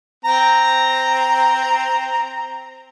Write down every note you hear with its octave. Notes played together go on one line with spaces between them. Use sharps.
C4 A#5